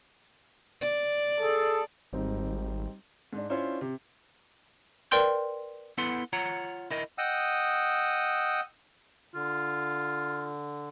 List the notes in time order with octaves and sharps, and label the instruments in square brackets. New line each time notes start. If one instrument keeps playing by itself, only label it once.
[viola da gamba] D5
[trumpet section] G#4 A4
[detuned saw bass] G#1 [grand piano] G3 C4 D#4
[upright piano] G#2 D4
C#4 D4 E4 F4 C5 C#5
C3
[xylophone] A#4 B4 D5 G5 C6 G6
[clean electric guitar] B3 E4 A4 B4 F#5 C6
F4 C#5 F#5 A#5
E4 A#4 D#5
[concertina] D#5 F#5 G5 D#6 E6
[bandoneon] D3 [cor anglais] F4